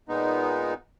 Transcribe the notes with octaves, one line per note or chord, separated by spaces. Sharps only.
A#2 G#3 B3 D#4